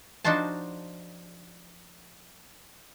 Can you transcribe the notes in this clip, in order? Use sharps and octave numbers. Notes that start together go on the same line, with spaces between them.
F3 D4 D#4 F#4 C5 A5